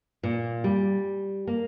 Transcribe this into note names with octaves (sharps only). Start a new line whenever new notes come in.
A#2
G3
A#3